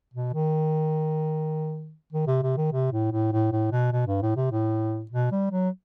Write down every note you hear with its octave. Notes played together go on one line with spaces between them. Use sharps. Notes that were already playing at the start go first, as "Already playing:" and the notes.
B2
D#3
D#3
C3
C3
D#3
C3
A2
A2
A2
A2
B2
B2
G2
A2
C3
A2
B2
G3
F#3